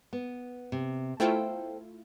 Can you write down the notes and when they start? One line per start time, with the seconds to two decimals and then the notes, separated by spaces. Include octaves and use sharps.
0.13 B3
0.72 C3
1.20 A3 E4 F4 A4 C5 G5